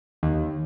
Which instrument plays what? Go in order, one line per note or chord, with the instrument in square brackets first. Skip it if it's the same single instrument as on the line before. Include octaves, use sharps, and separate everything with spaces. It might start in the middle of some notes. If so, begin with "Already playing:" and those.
[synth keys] D#2